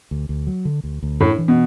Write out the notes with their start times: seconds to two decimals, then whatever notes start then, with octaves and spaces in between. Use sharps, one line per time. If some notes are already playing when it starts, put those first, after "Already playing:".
0.11 D2
0.29 D2
0.47 F#3
0.65 D3
0.84 D2
1.03 D2
1.20 A2 D4
1.38 E3
1.48 B2